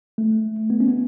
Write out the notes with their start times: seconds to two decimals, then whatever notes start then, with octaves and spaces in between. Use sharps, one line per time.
0.18 A3
0.70 B3
0.80 C#4
0.88 B3